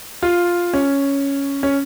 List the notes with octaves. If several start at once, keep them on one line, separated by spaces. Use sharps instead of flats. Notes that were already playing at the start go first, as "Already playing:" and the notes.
F4
C#4
C#4